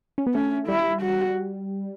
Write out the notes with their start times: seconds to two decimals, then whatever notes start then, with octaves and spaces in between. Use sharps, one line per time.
0.18 C#4
0.27 B3
0.34 A3 C#4
0.68 G3 E4
1.02 F#4